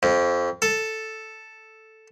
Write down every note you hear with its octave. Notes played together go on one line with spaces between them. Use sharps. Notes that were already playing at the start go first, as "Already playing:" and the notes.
F2
A4